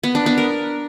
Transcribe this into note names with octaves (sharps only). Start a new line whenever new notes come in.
B3
D4
B3
A#4